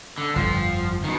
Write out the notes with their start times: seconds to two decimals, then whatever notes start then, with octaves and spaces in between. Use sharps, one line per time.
0.18 D3
0.36 G1 F2 F3
1.04 B2 D#3